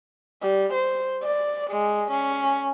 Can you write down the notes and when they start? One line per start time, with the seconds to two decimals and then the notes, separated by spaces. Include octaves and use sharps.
0.42 G3
0.73 C5
1.23 D5
1.71 G#3
2.11 C#4